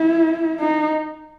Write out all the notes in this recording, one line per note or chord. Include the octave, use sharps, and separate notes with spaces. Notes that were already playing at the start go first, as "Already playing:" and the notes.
Already playing: E4
D#4